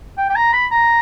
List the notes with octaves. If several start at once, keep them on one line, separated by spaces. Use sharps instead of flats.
G5
G5
A#5
B5
A#5